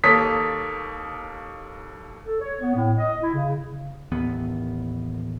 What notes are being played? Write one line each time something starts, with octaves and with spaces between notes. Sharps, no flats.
D#2 A#3 A4 C#5 D#6 B6
A4
C#5
B3
A2
D#5
E4
C#3
A1 D#2 B3